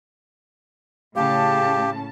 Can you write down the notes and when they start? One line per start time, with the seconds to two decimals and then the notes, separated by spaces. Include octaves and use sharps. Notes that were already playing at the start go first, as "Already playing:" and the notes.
1.16 A2 C#3 G4 F5 A5